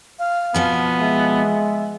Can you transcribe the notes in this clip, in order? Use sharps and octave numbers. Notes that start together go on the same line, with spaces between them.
F5
B2 F3 B3 G#5
G#3 E5